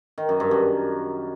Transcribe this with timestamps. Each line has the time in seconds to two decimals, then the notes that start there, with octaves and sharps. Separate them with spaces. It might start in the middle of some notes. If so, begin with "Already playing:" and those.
0.18 D#3
0.29 F#2
0.40 G2
0.51 F#2